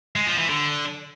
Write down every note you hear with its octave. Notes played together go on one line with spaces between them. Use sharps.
G#3
F3
E3
D3